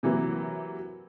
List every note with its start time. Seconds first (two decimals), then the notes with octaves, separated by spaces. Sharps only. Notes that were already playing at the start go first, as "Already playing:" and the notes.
0.03 C3 E3 F#3 A#3